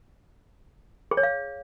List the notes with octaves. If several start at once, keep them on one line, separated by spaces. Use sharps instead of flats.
G#4
C#5
F5